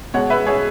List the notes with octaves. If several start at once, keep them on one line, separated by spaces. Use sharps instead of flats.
B2 G#3 C#5 F#5
B4 E5
G#4 C#5